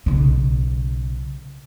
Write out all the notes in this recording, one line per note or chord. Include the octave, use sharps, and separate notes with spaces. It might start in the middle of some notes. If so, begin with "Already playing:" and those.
B1 C#3